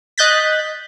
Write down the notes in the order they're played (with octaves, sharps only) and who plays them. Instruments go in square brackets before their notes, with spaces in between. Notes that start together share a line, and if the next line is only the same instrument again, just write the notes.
[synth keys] D#5 F#6 G6 A6 B6